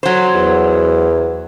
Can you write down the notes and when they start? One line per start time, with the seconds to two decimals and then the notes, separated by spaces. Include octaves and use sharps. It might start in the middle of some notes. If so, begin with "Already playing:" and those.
0.03 F#3 C5
0.35 E2